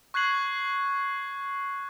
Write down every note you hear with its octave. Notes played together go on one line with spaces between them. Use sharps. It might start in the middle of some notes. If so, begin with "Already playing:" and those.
C#6 F#6 G#6 C7 F#7